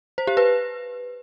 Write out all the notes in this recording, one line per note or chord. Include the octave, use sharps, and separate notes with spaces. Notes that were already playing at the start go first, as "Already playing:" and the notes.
C5
G4
B4